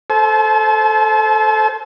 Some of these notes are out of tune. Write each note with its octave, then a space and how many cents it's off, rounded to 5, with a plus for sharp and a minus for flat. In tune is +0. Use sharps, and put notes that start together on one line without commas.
A4 -5 C5 +0 A5 -40